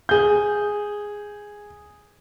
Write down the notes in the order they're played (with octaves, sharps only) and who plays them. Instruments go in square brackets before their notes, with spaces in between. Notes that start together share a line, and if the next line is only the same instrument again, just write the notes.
[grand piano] G#4 G6